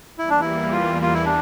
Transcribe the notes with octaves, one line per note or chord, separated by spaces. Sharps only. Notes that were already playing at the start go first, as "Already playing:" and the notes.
E2 E3 G3 A#3 E4
D4
E4
F4
F4
E4
D4